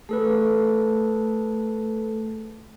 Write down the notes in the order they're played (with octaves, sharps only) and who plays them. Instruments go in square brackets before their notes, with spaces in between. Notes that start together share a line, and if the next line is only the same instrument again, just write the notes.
[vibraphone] A3 [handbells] G#4 A4 B4